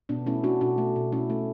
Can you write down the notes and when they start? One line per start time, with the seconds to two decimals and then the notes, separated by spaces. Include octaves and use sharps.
0.09 B2 B3 D4
0.26 A3 C#4 E4
0.44 A3 D4 F#4
0.61 B2 D4 F#4
0.78 A3
0.96 B2
1.12 A3 C#4 E4
1.30 A3